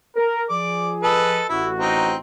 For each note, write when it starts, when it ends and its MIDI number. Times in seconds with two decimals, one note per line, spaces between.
0.16 0.43 70
0.50 1.39 53
0.50 1.39 68
0.50 0.92 74
0.50 0.92 86
1.03 1.45 69
1.03 1.45 71
1.03 1.45 75
1.49 2.14 33
1.49 1.69 64
1.49 2.14 66
1.79 2.16 60
1.79 2.16 63